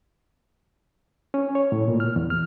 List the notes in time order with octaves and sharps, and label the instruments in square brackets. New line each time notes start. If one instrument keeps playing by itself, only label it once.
[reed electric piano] C#4
C#5
A2
A#2
F6
E2
F6